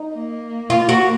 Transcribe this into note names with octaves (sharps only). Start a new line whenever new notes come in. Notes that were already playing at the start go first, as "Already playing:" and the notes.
Already playing: D#4
A#3
F4
F#4